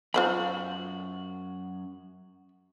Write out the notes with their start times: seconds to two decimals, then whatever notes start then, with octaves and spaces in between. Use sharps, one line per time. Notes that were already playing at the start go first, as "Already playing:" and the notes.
0.14 F#2 F4 F#4 C5 B5